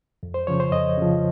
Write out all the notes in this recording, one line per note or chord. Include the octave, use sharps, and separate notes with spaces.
F2
C5
C#3 F3 C#5
C5
F2 D#5
C#3 F3